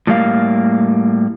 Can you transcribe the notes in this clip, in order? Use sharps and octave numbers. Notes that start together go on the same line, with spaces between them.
A2 G3 A#3 F5